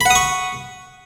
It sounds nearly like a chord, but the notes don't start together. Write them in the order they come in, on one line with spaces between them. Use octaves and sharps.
B5 F#5 D#6 C#6